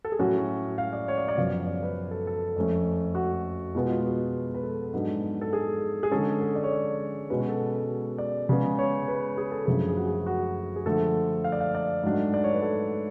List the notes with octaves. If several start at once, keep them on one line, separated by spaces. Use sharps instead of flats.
A4
G#4
A2 F#3 C#4 F#4
F5
D5
C#5
D5
D5
F#2 C#3 F3 B3 F5
D5
B4
A4
A4
F2 F3 A3 C#4
F#4
B2 G#3 B3 F4
F4
F#4
B4
A4
G#2 F#3 B3 D4
A4
G#4
G#4
D3 G#3 C#4 A4
A4
D5
C#5
D5
B2 G#3 C#4 B4
F#4
A4
D5
C#3 G#3 B3
C#5
B4
G#4
A4
F#2 C#3 F3 A3 D4 G#4
G#4
F#4
G#4
F#4
G#4
D3 F3 A3 A4
F5
D5
F5
D5
G#2 F#3 A3 D4
D5
C#5
B4
A4